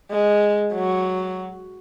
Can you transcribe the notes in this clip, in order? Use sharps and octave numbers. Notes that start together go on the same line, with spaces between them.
G#3
F#3